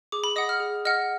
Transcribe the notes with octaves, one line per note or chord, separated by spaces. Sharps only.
G#4 D6
B5
D#5 F#5 D#6
F6
G#4
D#5 F#5 F6